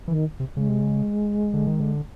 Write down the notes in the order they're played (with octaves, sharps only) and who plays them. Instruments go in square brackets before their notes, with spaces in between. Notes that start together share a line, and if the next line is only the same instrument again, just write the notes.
[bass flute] D#3 [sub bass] E3
[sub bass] C3
[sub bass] C#3 [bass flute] G#3
[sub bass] C3
C#3
D3
D#3
D3